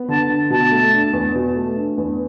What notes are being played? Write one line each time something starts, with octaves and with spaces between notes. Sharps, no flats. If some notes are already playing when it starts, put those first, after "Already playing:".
Already playing: B3
D3 A5
D3
B2 A5
A3
D4
E2
B2
A3
D4
E2